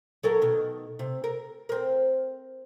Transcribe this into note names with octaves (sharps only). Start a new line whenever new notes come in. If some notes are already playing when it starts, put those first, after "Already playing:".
F#3 A4 A#4
B2 D#3
C3
A#4
C4 A#4